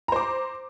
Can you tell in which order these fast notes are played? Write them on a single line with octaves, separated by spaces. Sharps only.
A#5 C5 D6